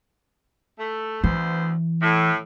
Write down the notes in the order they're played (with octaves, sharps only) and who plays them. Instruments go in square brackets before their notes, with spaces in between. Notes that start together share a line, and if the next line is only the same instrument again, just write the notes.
[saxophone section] A3
[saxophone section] D2 B3 C5 [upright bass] E3
[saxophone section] A2